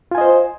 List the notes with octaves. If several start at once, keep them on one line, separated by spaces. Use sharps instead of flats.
F4 C5 D#5 G#5